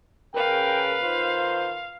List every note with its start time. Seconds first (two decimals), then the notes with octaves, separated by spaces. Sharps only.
0.35 C#3 A#4 B4 F5 G5
1.03 D#3 F4 C5